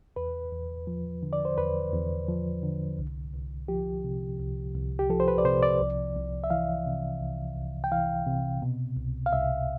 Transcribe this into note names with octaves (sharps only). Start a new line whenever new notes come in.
E2 B4
E2
F3
D3
D5
C5
E2 B4
E2
F3
D3
C2
C2
F3 G4
C3
C2
C2
G4
F3 A4
C5
B4
D5
C3 C5
D5
C2
C2
E5
E3 F5
C3
C2
C2
G5
E3 F5
C3
B2
C2
F5
C2 E5